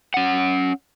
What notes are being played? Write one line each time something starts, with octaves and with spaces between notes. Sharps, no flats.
C#4 F#5